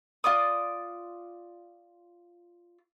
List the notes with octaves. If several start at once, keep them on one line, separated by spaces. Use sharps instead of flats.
F4 D5 D6 D#6